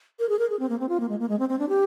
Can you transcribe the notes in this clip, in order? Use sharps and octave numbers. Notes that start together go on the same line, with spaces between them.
A#4
G#4
A#4
G#4
C4
A#3
C4
F4
A#3
G#3
A#3
G#3
C4
C4
D4
G4